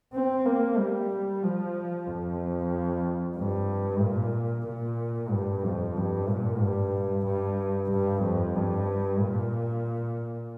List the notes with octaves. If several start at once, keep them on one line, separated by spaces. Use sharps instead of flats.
C4
A#3
G3
F3
F2
G2
A#2
A#2
G2
F2
G2
A#2
G2
G2
G2
F2
G2
A#2